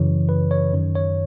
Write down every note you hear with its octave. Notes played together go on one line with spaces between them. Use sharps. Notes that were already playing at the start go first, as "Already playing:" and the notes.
Already playing: F#2 C#3 E3 C#5
B4
C#5
F#2 D#3
C#5